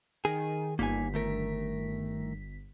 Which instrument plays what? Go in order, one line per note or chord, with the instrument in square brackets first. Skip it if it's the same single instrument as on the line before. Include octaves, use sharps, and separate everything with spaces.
[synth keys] D#3 [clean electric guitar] G#4
[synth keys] G1 B6 [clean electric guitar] A#3 D#4 G#5
[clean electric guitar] D#3 A3 A#4